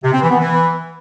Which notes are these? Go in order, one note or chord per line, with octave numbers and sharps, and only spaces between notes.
C3
C4
E3
B3
E3